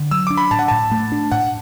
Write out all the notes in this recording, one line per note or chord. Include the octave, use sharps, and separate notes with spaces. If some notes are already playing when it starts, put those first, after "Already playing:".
Already playing: D3
F#3 E6
D4 D6
B5
A2 A5
F#5
A2 A5
A3
D4
A2 F#5